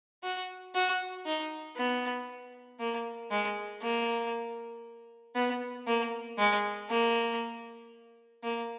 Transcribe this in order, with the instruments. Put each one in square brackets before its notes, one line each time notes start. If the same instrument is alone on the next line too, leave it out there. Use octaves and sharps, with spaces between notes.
[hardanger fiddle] F#4
F#4
D#4
B3
A#3
G#3
A#3
B3
A#3
G#3
A#3
A#3